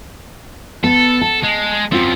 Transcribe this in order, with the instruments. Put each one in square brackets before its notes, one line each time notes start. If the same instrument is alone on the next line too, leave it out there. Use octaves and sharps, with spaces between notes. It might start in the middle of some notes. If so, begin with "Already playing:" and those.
[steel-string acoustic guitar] B3 [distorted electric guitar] A4
[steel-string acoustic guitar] A5
[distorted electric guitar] G#3
[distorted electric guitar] F#2 F3 [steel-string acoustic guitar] C4 F4